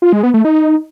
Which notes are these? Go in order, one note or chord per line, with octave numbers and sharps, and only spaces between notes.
F4
G#3
B3
A3
D#4